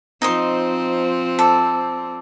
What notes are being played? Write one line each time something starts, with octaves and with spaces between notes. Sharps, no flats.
F3 C4 D#4 D#5 C6
A4 D5